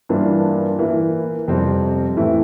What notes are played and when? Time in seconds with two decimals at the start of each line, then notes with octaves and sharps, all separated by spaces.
0.09 G2 E3 A#3 D4 F4
0.79 E3 A#3 E4
1.48 F2 C3 G3 C4
2.17 A2 E3 A3 E4